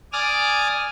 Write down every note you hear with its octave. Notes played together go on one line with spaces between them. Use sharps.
D5 G#5 D6 D#6 F6